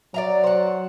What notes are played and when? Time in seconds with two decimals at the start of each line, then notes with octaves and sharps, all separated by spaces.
0.14 F#3 D5 F5 A#5
0.44 C5 F#5